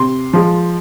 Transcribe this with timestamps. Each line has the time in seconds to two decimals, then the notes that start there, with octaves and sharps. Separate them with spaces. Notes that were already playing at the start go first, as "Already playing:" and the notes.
Already playing: C3 C6
0.33 F3 G#3